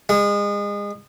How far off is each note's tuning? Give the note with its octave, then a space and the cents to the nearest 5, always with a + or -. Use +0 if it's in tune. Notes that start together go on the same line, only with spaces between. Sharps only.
G#3 -30